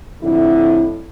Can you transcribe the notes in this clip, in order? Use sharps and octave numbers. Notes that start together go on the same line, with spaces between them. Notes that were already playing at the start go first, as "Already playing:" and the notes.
F2 A2 D3 E4